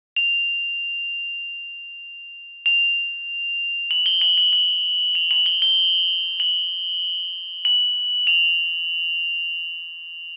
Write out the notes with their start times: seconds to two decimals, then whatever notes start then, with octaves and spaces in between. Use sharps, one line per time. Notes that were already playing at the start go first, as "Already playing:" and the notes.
0.16 F7
2.66 F7
3.91 F#7
4.06 G7
4.21 F#7
4.38 F#7
4.53 F#7
5.15 F7
5.31 F#7
5.46 G7
5.62 G7
6.40 F#7
7.65 F#7
8.27 F7